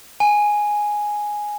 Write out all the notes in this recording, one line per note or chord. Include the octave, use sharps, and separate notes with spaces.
G#5